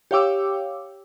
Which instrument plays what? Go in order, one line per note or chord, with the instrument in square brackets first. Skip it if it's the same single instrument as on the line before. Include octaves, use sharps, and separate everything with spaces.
[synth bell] G4 C#5 F5 G5 D6 E6